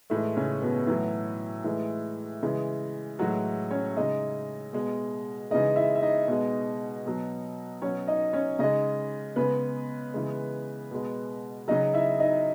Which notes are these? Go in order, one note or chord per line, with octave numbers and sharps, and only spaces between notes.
A2 E3 G#3 A3
C#3 C#4
B2 B3
A2 E3 F#3 E4
A2 E3 G#3
C#3 E3 G#3
A2 E3 F#3 G#3 F#4
C#4 C#5
C#3 G#3 D#4 D#5
B2 G#3
C#3 E3 G#3 D#4 D#5
E4 E5
E5
D#4 D#5
B2 G#3
B2 F#3
B2 F#3 C#4 C#5
D#4 D#5
C#4 C#5
C#3 G#3 D#4 D#5
C#3 G#3 B3 B4
C#3 E3 G#3
B2 G#3
C#3 F#3 D#4 D#5
E4 E5
D#4 D#5